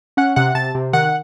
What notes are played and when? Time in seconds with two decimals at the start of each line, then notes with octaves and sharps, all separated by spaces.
0.17 C#4 F#5 F#6
0.36 C3 F#5 F#6
0.55 C3 A5 A6
0.75 C3
0.93 D#3 F#5 F#6